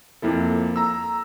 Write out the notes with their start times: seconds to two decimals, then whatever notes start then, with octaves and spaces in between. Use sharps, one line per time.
0.22 F2 A#3 E4 A4
0.76 A#5 E6